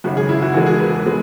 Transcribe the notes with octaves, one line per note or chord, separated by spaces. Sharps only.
G#1 F#2 C#3 F#4
G#4
E4
F#4
E1 E2 E3 G#3 F#4
G#4
B4
B2 G#3